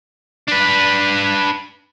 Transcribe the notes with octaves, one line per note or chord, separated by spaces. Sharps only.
D4 B4